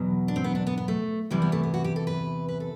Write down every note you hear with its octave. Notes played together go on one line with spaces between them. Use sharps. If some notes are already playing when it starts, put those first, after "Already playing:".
Already playing: E2 B2 F#3
D4
C4
B3
D4
B3
B3
A3
E2 C3 E3 G3
B3
A3
B3
F#4
G4
A4
B4
B4
A4